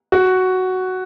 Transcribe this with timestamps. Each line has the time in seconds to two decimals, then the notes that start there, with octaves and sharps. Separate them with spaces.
0.12 F#4